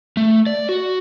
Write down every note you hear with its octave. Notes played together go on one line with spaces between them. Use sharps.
A3
D5
F#4